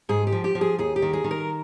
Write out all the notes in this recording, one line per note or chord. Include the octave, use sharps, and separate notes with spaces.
G#2 G#4
G4
F3
G4
F3
G#4
D#2 G#4
G4
D#3
G#4
D#3
A#4